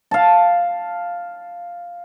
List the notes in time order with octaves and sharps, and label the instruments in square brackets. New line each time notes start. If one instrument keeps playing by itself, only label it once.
[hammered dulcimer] F5 A5